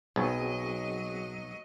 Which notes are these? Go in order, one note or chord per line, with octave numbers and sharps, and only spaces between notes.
B1 F#3 C4 F#4 G#4 D#5